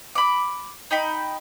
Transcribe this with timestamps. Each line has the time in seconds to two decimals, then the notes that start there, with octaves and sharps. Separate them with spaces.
0.15 B5 D6
0.91 D#4 G5 B5